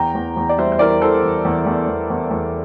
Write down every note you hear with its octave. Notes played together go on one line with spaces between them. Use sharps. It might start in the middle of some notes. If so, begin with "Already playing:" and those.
Already playing: E2 G5 A#5
E2
E2
D5
G3 C5 E5
C5
E3 A#4 D5
E3 A4 C5
E2
E2
E2
E2
E2
E2